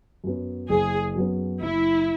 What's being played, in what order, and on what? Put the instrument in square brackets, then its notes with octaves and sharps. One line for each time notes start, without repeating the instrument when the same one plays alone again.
[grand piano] F#2 F#3 B3
[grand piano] F#1 [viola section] G#4
[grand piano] F#2 F#3 B3
[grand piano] F#1 [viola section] E4